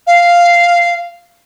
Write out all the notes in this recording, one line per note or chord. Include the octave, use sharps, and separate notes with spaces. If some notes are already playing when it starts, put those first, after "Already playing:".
F5